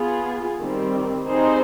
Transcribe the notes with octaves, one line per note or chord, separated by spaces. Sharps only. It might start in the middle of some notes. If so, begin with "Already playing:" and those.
Already playing: B3 F4 G#4
D#3 G3 C4
G3 C4 D#4 G#4 C5